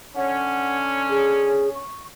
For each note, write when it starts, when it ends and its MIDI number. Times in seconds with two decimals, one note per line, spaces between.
0.16 1.87 50
0.16 1.87 61
0.16 0.78 78
1.10 1.69 68
1.75 2.03 85